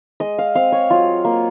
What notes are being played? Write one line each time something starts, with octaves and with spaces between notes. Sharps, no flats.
G#3 D#5
F5
C4 F5
C#5
F#3 F4
A#3